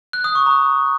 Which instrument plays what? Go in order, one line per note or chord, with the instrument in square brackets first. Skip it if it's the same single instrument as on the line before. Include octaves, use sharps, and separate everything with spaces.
[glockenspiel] F#6
D#6
C#6
A#5